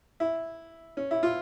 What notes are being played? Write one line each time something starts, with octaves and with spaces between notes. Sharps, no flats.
E4
C#4
E4
F4